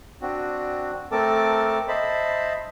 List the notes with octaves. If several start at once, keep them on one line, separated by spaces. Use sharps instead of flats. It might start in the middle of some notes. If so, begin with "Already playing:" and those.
C4 D4 F#4
A3 C4 A4 A#4 A5 D6
C5 D#5 E5 A5 B5